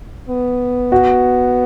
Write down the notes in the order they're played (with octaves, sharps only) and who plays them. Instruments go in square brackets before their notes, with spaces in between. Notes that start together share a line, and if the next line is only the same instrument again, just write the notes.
[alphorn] B3
[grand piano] F#4